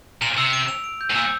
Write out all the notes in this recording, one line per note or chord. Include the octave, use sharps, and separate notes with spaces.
A#2 F7
C3 E6
D7
F7
D7
G6
A2
A#2 E6